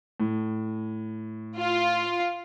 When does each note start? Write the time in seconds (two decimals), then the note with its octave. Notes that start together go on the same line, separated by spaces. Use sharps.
0.20 A2
1.59 F4